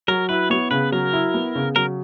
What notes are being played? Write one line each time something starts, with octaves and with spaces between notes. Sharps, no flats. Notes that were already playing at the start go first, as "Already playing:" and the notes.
F#3 A#4
E4 B4
B3 C#5
C#3 B4
F#3 A#4
E4
B3
C#3
F#3 A#4